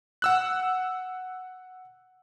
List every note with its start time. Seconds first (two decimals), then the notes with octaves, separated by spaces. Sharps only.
0.22 F#5 E6 F#6